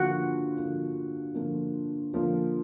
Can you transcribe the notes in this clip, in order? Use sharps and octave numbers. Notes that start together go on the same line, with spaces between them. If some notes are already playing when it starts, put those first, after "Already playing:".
Already playing: D3 F3 A#3 F4 F#4
D3 F3 A#3 F4
D3 F3 A#3 F4
D3 F3 A#3 F4